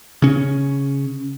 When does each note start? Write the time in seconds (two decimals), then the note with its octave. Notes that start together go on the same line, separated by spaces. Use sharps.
0.22 C#3 C#4